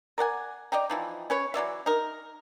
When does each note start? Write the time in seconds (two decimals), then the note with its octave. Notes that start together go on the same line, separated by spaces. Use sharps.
0.18 A#4 D5 F#5 G#5
0.72 D5 D#5 G5 A#5
0.90 E3 F3 D#4
1.30 C#4 B4 C#5
1.54 E3 F#3 D5 E5
1.86 D#4 A#4